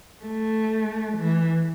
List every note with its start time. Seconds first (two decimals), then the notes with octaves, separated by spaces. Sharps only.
0.25 A3
1.18 E3